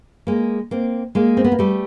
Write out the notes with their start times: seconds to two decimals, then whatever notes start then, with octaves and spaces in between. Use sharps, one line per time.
0.27 G#3 A#3
0.71 A#3 C4
1.15 G#3 A#3
1.37 C4
1.44 B3
1.52 A#3
1.59 G3 A3